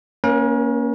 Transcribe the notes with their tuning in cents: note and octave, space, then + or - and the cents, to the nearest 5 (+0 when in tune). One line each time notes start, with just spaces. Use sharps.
A#3 +0 C#4 +0 A#4 +45